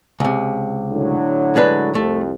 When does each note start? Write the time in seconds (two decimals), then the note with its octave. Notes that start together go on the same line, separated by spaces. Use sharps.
0.20 C#2 C3
0.92 A2 D3 F#3
1.56 G#3 D4 B4
1.95 C2 F2 A3